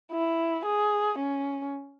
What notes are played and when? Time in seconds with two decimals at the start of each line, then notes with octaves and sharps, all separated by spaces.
0.12 E4
0.65 G#4
1.18 C#4